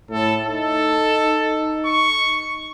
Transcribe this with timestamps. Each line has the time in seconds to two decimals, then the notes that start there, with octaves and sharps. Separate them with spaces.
0.11 A2 A4
0.47 D#4 A4
1.85 C#6